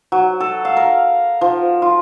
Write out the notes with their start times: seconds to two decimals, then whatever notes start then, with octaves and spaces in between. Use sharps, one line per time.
0.12 F#3
0.40 A4
0.65 F5
0.77 A#4
1.41 F3
1.82 F4